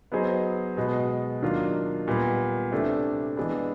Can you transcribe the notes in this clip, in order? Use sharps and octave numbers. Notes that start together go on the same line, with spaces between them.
F#3 B3 D#4 G#4 C5
B2 G#3 B3
D#3 F#3 A#3 D4 F4
A#2 G3 B3
C3 E3 A3 D4
E3 G#3 B3 D4